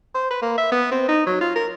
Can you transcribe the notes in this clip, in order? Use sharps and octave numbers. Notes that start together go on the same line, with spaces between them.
C5
B4
A#3
E5
B3
C4
D#4
F#3
F4
A#4